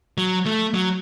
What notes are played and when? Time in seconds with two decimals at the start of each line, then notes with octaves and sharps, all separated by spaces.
0.18 F#3
0.46 A3
0.74 F#3